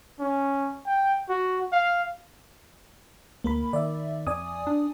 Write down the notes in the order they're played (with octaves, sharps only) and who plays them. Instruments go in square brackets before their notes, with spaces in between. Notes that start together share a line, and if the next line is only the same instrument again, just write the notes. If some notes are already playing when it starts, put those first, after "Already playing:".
[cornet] C#4
G5
F#4
F5
[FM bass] D2 [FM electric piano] A#3 A#4 B5
[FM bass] D#3 [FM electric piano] D5 E5
[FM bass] F2 [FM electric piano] D5 G#5 D#6
[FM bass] D4